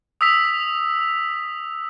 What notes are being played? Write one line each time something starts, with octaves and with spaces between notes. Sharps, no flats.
D#6 E6 B6 F7